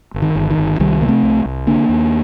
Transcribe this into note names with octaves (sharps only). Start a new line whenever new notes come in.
G1
D#3
G1
D#3
G1
C2 D#3 G3
C3 A#3
A3 C4
C2
C2
D3 A#3 D4
D#2